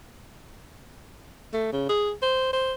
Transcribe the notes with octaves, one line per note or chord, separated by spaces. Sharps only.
A3
C#3
G#4
C5
C5